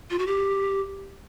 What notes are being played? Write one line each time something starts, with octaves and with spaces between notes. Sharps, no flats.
F4
F#4
G4